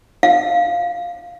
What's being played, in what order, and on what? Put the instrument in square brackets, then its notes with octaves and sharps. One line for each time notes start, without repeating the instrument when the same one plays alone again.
[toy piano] F5